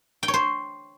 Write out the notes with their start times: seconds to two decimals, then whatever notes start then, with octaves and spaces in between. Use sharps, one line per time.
0.23 G5
0.28 C#5
0.34 C5